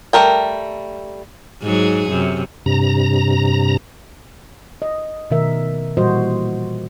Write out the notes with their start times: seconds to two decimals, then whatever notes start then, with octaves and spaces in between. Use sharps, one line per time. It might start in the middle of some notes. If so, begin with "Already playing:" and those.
0.13 G3 A3 A#4 G5
1.62 G#2 F#3 G#4
2.09 F#2 C3
2.66 G2 C3 A#5
4.82 D#5
5.30 B2 D#3 A3 A#4 E5
5.97 A#2 E3 G3 F#4 C5 D#5